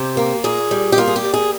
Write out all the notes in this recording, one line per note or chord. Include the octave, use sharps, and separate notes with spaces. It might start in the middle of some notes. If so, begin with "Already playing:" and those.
Already playing: C3 G4
A#3
A#2 G#4
G3
G4
A#3 F4
G#4
G4
G3
G#4